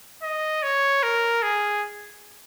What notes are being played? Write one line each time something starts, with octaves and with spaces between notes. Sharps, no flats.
D#5
C#5
A#4
G#4